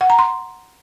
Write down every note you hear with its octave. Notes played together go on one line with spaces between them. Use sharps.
F#5
A#5
C6